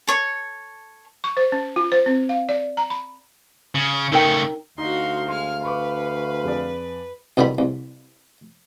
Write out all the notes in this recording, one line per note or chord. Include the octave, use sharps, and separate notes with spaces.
A4 C#5 C#6
C#6
C5
C#4
F4
C5
C4
F5
D5
A#5
B5
C#3
C#3 A3 D#4 A#4 G5
D2 D#4 F#4 F5 C6
G#3 C6 F6
B4 B5 C#6 D6
F2 G#4 D5
C2 B2 D3 D#3 B5
C2